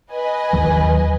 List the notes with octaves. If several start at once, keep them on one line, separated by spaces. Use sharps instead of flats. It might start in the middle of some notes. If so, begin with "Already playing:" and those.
B4 D#5 G#5
D#2 D#3 F#3